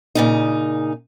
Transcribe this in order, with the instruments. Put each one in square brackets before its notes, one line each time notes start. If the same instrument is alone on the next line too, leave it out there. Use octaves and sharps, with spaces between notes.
[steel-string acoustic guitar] A#2 C#3 D#4